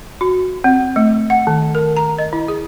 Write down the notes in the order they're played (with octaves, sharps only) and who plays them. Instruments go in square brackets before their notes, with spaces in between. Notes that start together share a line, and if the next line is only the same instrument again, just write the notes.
[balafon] F#4
C4
A3
F#5
D#3
A#4
A#5
D#5
E4
G#4